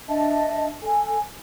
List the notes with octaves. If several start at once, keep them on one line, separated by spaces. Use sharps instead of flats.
D4 D#5 E5 A5
A4 G#5